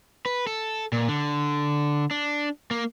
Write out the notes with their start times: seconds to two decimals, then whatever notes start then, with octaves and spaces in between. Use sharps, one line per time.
0.26 B4
0.47 A4
0.92 A#2
1.08 D3
2.11 D4
2.71 A#3